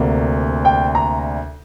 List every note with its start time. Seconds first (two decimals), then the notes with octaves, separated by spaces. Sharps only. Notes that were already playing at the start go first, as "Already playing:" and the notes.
Already playing: D2 C3 A#3 D4
0.65 G5
0.95 A#5